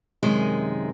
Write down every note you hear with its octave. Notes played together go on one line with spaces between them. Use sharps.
F#2 C3 D#3 G#3 G#5